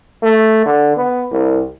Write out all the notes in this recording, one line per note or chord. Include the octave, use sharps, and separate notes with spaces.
A3
D3
B3
C2